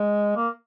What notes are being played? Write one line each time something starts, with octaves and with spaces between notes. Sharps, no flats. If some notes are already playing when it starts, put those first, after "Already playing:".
Already playing: G#3
A#3